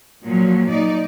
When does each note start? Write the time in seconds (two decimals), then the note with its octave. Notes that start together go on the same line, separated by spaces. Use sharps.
0.24 A#2 F3 F#3
0.69 D#4 D5